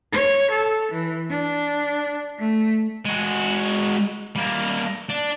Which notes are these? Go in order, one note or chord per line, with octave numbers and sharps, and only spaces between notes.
C#5
A4
E3
D4
A3
G#3 F#4
G3 A#3
D4